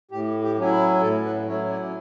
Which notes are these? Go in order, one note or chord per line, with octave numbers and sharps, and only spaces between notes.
A2 G4
G4
F#3 C#4 E4
B4
A2 A4
B4
F#3 C#4 E4 C#5
D5